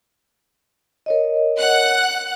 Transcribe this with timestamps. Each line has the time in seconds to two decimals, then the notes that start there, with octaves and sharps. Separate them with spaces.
1.06 A#4 C#5 D#5
1.58 F#5 F#6